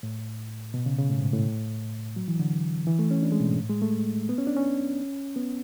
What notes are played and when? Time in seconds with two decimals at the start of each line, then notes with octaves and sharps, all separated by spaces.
0.03 A2
0.74 B2
0.86 C#3
0.98 C#3
1.10 A2
1.21 G#2
1.33 A2
2.16 F#3
2.28 E3
2.39 D3
2.87 E3
2.99 A3
3.11 C#4
3.23 D4
3.32 G#3
3.40 B2
3.50 G#2
3.58 A2
3.69 G#3
3.82 A3
4.29 B3
4.38 C#4
4.47 D4
4.56 C#4
5.36 B3